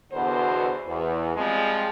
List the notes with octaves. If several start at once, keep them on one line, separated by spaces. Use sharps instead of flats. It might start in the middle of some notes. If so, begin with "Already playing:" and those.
E2 B2 D3 B3 F#4 C5
E2
F3 G3 G#3 C4